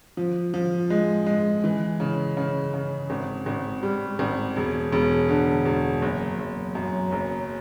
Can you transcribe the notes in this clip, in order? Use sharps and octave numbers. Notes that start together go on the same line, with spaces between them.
F3
F3
G#3
G#3
E3
C#3
C#3
C#3
G#1
G#1
G3
G#1
E1
E1
D3
E1
F#1
F#1
F#2
F#1